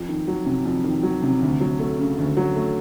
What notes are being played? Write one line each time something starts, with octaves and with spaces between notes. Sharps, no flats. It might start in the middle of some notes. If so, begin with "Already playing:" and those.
Already playing: F2
D#3
F#3
C3
F2
D#3
F#3
C3
D2
F#3
A3
C#3
D2
F#3
A3